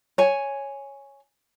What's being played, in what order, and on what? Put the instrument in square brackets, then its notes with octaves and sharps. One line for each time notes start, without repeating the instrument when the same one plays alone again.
[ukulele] C#5 G#5